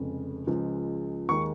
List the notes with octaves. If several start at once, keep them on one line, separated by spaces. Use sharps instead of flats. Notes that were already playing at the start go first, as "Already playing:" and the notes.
Already playing: F1 F2 C#3 G#3
C#2 C#3 F3 G#3
D#2 D#3 G#3 C#6